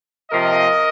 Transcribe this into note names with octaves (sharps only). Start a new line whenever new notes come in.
C3 F3 A#3 A#4 D#5